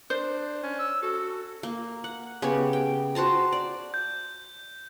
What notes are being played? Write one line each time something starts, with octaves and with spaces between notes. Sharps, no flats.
D4 C5
C#4
E6
F#4 A4
A#3
F#5
C#3 B3 G4 C#5
G5
F#4 C5 A5 A#5
D5
G6